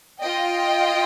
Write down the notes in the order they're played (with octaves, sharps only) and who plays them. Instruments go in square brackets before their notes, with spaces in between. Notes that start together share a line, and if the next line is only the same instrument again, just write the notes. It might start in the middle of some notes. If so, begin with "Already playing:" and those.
[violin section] F4 D#5 G5